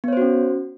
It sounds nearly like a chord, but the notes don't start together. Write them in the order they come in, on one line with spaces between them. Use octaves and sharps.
B3 C#5 C5 F#4 C#4